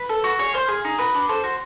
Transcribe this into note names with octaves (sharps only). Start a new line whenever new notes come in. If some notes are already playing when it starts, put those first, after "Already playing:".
Already playing: B4
A4
F#4
G#4 C#5
F4 C5
G#4
D#4
F#4 B4
D4
A4 C5
F#4